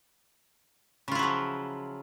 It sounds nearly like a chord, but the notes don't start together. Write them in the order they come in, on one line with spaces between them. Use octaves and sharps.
C#3 F4 E4 F#3 F3